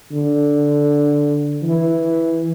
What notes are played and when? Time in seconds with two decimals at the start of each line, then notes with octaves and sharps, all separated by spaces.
0.12 D3
1.62 E3